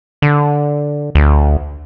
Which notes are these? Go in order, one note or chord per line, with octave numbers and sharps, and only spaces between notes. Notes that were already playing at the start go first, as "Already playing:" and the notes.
D3
D2